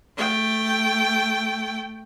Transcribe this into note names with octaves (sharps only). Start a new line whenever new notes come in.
A3 G5